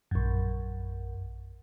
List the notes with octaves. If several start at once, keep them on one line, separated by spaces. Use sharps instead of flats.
A#1 F#2